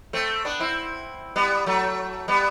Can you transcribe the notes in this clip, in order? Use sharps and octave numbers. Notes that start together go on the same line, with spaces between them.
A3 C4
B3 D4
C4 E4
G3 B3
F#3 A3
G3 B3